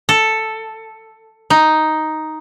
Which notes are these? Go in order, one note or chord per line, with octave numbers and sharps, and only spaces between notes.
A4
D#4